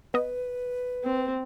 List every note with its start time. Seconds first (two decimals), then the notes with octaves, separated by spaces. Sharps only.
0.14 B3 B4 D#5
1.03 C4